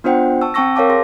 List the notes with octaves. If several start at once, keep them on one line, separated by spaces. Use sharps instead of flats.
B3 D4 F4 C5 F#5 G5
A5 C#6 E6
C4 G5 A5 C#6 E6 A#6
A#4 C#5 F5 A5 D6
G#4 C6 A#6